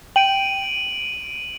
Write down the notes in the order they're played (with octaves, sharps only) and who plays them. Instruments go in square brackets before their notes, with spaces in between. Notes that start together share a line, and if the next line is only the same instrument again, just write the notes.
[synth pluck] G5 [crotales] D7 D#7 F#7